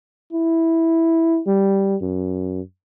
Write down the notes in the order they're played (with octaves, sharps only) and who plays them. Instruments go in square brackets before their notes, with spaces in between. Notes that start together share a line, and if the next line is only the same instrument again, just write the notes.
[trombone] E4
G3
F#2